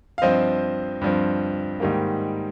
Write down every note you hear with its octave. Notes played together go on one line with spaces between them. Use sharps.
F5
G2 F3 C4 C5 D#5
G2 F3 C4
G#2 D#3 G3 A#3